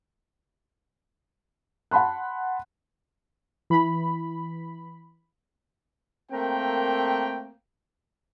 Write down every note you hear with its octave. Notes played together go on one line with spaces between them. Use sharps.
F#5 A5 B5 C6 F#6
E3 B5
A3 A#3 C4 A#4 G5